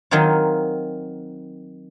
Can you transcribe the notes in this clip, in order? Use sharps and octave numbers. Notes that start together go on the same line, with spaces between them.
D#3 F#3 C4 D#4 F4